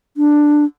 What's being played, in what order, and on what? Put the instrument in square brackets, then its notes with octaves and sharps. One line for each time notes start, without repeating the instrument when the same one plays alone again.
[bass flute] D4